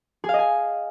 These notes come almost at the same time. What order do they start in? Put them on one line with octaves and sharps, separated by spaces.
G#4 F5 D#5 G#5